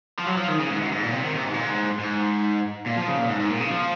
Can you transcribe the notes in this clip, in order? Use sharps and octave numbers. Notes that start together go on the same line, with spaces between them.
F3
F#3
F3
D#3
C#3
G#2
F#2
G#2
A#2
C3
D#3
C3
G#2
A#2
G#2
G#2
A#2
F3
C#3
A#2
G#2
G#2
A#2
C#3
F3